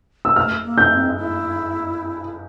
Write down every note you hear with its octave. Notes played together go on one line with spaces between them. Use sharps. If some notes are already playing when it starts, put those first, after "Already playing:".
E6
A3 F6
A#3
G6
C4
E4